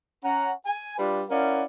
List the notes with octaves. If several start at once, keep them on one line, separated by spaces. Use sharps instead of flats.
C#4 F#5 A#5
G#5
G3 D4 F4 B4 D5
C#4 E4 A#4 D5 F5 F#5